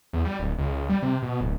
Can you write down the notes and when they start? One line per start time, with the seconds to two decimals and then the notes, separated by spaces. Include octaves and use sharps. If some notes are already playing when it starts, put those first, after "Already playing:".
0.13 E2
0.25 G3
0.39 D1
0.58 C#2
0.89 G3
1.02 C3
1.22 B2
1.41 D1